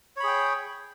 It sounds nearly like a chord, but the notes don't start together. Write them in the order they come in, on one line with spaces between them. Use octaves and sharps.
C#5 B5 G#4 G5